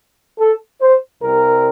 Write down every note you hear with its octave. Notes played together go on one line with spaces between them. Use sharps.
A4
C5
C2 C3 G3 C4 A#4